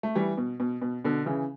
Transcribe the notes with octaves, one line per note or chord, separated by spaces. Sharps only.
A3
E3 G3
B2
B2
B2
B2 D3
C#3 E3